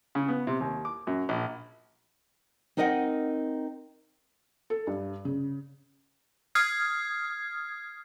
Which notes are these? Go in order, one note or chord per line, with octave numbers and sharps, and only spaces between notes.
C#3
B3
C3
D#2
D6
F#2
A#1
C4 D#4 A#4 D#5 F5 F#5
A4
G2
C#3
D#6 F6 G#6 C7